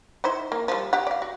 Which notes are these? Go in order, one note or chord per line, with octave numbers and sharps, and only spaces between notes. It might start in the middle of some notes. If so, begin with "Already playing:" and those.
D#4 E4 C5
A#3
F3 G3
G4 F#5
D5 F5
F#4